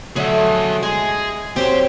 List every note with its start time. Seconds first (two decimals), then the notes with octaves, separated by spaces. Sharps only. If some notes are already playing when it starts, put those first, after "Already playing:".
0.16 D3 F#3 A3 G#4 E5
0.83 G#3 G#4
1.56 F#2 F#3 C4 G4